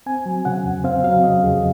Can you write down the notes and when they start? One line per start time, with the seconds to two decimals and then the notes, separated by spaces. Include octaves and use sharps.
0.06 C4 G#5
0.26 F#3
0.45 C#3 F#5
0.65 F2
0.84 C4 F5
1.04 F#3 F5
1.23 C#3 D#5
1.43 F2 G#4